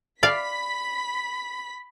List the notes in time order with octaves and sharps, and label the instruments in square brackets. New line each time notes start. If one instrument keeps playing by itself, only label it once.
[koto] D5 F5 [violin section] B5 B6